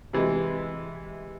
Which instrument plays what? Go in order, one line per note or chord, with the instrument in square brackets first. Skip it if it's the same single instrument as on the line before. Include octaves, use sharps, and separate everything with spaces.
[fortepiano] C3 E3 G#3